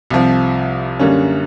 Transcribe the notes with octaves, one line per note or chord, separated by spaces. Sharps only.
C2 C3 F3
F#2 D3 G3 A#3 C#4